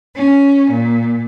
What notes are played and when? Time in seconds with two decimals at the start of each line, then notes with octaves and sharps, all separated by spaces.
0.15 C#4
0.69 A#2